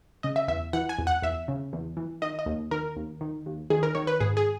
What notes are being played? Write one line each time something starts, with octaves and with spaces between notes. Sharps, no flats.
C#3 D#5
E5
E2 E5
E3 F#5
G#5
E2
F#5
E2 E5
C#3
E2
E3
D#3 D#5
D#5
D#2
D#3 A#4
D#2
D#3
D#2
D#3 G#4
A#4
D#3 C#5
B4
G#2 G#4
G#4